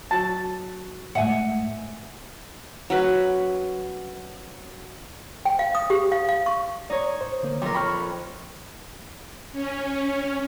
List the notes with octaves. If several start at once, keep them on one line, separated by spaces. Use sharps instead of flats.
F#3 A5
G#2 A3 D#5 E5 F#5 G#5
F#3 C#4 B4
G5
F5
D#6
G4
F5
F5
C#6
D#4 C#5 D5
C5
D3 A#3
F2 A#4 C#5 G5 D6
B5 C#6 F6
C#4